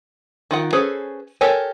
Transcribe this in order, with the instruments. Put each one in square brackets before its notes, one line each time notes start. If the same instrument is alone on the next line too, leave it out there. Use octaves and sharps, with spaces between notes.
[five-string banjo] D#3 F4 F#5
C#4 G#4 A4 B4 C5
G4 A4 A#4 C#5 G#5